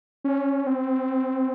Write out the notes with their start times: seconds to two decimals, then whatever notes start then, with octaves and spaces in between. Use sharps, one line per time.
0.24 C#4
0.67 C4